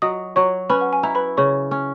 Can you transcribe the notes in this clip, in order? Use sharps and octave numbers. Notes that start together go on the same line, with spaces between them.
F#3 D#5 D#6
F#3 C#5 C#6
C#4 B4 B5
F#5
G#5
E4 A#5
B4 B5
C#3 C#5 C#6
C#4